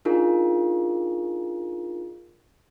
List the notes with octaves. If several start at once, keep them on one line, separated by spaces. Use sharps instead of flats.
D4 D#4 F4 G#4 A#4